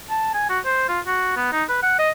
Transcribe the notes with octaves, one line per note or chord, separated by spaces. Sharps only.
A5
G#5
F#4
C5
F4
F#4
B3
D#4
B4
F#5
D#5